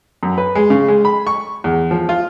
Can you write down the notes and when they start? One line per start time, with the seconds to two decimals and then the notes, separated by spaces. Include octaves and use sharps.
0.23 F#2
0.38 B4
0.55 G#3
0.70 C#3
0.88 G#3
1.05 B5
1.27 C#6
1.64 E2
1.91 F3
2.09 F4